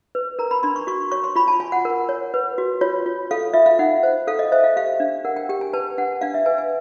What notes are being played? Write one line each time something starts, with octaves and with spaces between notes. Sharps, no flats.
B4
A#4 A#5
B5
D4 C6
C#6
F#4 C#6
C#5 C#6
C6
F4 B5
A5
F4 G#5
F#5
A#4
C#5
B4
F#4
F4 C#5
F4
A4 F5
F4 E5
F5
D#4 F#5
C5
A4 F5
D#5
C5 E5
F5
G4 F5
D4
A#4 F#5
G5
G4 G5
G#5
B4 A5
D4 F#5
D4 F5
E5
B4 G#5
G#5